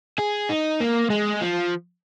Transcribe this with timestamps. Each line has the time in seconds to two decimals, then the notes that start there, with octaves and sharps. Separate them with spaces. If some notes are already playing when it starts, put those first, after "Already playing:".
0.19 G#4
0.50 D#4
0.81 A#3
1.10 G#3
1.41 F3